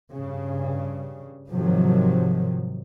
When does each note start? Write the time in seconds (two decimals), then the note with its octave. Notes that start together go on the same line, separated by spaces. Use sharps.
0.12 G2 C#3
1.50 G#2 C3 D#3 F3 F#3